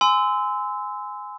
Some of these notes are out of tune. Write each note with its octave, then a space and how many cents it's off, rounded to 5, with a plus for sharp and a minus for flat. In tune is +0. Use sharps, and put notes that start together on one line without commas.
G#5 +0 C6 -30 E6 -15